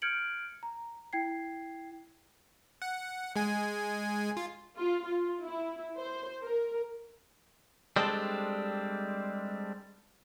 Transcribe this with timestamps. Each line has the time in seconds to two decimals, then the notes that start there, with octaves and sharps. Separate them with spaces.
0.02 F6 G6 G#6 C#7 D7 F#7
0.63 A#5
1.13 E4 G5 G#6 C7
2.82 F#5
3.36 G#3 G#5
4.37 F4
4.77 F4
5.05 F4
5.41 E4
6.00 C5
6.42 A#4
7.96 G3 G#3 C4 D4 A4